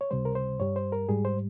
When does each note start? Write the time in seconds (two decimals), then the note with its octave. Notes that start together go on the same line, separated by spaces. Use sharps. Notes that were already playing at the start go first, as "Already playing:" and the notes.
0.01 C#5
0.11 C#2 C3 G3 C5
0.25 A#4
0.35 C5
0.59 G2 G3 C#5
0.76 C5
0.92 A#4
1.09 G#2 G3 G#4
1.25 C5